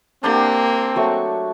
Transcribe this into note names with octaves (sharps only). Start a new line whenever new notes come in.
A#3 C4 D4 G4
F#3 A3 C#6